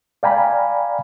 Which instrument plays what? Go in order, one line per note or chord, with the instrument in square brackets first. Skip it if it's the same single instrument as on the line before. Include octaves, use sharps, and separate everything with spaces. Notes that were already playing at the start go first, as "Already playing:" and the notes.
[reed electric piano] D5 F5 G5 G#5 A#5 B5